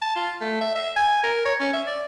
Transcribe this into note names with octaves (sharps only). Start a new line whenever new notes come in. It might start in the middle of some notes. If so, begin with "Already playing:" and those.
A5
F4
A3
E5
E5
G#5
A#4
C#5
C#4
E5
D5